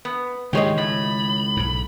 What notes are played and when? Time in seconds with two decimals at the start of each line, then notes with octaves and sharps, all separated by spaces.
0.05 B3
0.53 C#2 G#2 D#3 E3 G4 G#4 C#5 D#5
0.78 A2 B5
1.57 B1 G#2